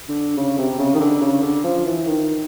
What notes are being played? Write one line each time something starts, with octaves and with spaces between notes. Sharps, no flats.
D3
C#3
C3
C#3
D#3
D3
C#3
D3
F3
E3
D#3